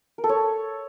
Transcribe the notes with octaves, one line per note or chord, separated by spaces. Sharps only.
A#4
A4
C#5